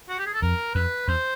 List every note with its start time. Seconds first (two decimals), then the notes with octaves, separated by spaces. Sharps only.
0.09 F#4
0.18 G4
0.26 G#4
0.33 A4
0.42 F2 A#4
0.74 F2 B4
1.08 E2 C5